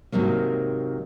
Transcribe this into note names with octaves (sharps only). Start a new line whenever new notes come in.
G#2 C3 D#3 F#3 A#3